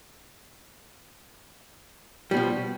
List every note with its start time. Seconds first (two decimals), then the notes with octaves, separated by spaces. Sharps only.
2.31 G3
2.34 B2
2.36 F3